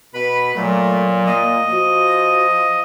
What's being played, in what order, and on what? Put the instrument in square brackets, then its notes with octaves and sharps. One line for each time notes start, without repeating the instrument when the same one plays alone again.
[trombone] B2 [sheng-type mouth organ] B4 B5
[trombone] A#2 [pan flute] F#3 [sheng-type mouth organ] A3
[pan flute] A#3 [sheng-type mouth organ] D#5
[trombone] F3 [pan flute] F#4